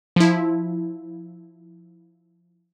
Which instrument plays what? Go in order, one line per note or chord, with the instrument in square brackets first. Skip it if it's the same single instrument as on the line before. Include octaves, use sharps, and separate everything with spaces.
[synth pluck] F3 E4